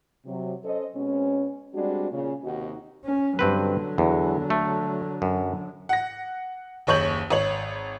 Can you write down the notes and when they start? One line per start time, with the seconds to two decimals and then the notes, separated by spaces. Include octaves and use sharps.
0.25 C3 F#3
0.64 C#4 A4 C5 D#5
0.95 B2 G#3 C4 C#4
1.74 G3 G#3 C4 D4 F#4
2.11 A#2 C#3
2.43 D#2 C3 D#4 F#4
3.05 C#4
3.39 G2 D3 F#3 C4 B4
3.98 E2
4.50 A3
5.22 F#2
5.89 F#5 A#6
6.87 F#1 D#2 C#5 C#6 G6 F#7
7.30 G#1 C#5 F#7